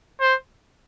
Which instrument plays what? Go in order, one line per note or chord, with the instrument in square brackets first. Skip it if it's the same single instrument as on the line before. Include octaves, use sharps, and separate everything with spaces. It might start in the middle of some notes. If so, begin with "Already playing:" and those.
[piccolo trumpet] C5